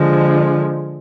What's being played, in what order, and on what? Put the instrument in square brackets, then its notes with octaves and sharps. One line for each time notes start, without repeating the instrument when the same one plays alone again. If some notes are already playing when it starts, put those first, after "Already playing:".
Already playing: [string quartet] D3 F3 G#3